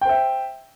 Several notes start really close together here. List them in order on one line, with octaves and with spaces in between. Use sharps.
G5 C5 E5